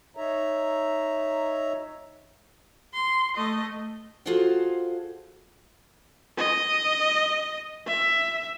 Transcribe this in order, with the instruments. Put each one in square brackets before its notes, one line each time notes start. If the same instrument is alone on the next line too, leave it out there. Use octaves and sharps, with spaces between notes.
[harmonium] D#4 C#5 E5 A#5
[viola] C6
A3 D#5
[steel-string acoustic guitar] F4 F#4 G#4 A4 C5 F#5
[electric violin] D#5
E5